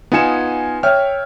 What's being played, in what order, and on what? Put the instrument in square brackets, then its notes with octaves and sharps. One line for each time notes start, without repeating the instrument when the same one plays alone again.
[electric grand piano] B3 D#4 F4 G#5 C#7 E7
C#5 E5 G5 F6